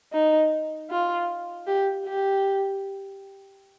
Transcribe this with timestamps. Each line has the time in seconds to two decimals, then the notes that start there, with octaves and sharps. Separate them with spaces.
0.13 D#4
0.90 F4
1.67 G4
2.06 G4